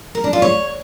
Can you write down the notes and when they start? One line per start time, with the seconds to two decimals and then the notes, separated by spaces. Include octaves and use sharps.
0.15 A#4
0.24 D4
0.33 F4
0.42 C#5